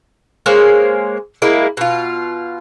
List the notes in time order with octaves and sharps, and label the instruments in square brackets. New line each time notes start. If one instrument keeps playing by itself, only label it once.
[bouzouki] G#3 A#3 C5 C#5
G#3 A#3 E4
B2 F4